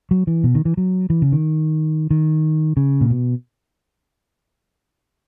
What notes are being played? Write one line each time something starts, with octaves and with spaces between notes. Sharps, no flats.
F#3
E3
B2
D#3
E3
F#3
E3
C#3
D#3
D#3
C#3
A#2
B2